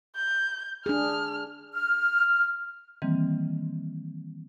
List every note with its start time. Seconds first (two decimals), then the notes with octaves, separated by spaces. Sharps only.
0.16 G6
0.86 D4 G#4 F6
1.74 F6
3.02 D#3 E3 G3 A#3 C4